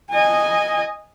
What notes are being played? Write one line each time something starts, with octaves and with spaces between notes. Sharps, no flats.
D#5 G#5